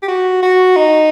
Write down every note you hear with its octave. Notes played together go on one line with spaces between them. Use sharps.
G4
F#4
F#4
D#4